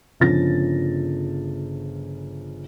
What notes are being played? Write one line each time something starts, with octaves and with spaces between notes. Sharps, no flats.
G1 C#3 F3 A6 A#6